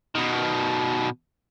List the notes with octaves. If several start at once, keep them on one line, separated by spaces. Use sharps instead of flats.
B2 D#3